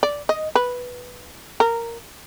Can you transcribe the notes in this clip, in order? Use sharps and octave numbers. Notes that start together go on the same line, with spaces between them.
D5
D#5
B4
A#4